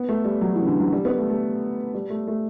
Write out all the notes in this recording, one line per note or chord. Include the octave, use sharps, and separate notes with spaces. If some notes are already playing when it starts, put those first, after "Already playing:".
Already playing: B3
A3
G3
F#3
E3
C#3
D3
F#3
G3
B3
A3
A3
G3
A3
A3